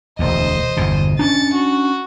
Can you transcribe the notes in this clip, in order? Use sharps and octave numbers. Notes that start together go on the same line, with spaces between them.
E1 D2 C5 D#5
G1 E2 B2
C#4 D4 A6 C#7
F#4